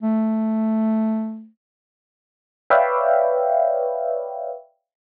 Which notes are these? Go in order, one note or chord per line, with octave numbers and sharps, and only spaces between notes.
A3
B4 C#5 D5 E5 F5 G5